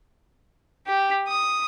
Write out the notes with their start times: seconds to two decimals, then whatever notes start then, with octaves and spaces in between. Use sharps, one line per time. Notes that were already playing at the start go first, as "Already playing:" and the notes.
0.87 G4
1.28 D#6